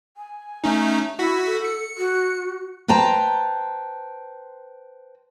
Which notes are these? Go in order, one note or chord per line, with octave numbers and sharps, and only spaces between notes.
G#5
A3 C#4 D#4
E4 F#4 F#5 B6
A4
C#7
F#4
B4 C5 G5 A5 A#5